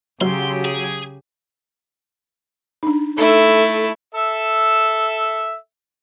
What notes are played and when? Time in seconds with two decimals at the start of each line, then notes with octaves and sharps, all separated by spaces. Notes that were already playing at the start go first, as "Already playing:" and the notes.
0.21 C#3 F#3 G4 C6
0.65 G#4
2.83 D4 D#4
3.18 A3 D#4 E4 A4 E5
4.14 A4 E5